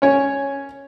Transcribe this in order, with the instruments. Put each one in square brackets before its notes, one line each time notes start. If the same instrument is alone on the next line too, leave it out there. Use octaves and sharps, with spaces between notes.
[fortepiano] C#4 C#5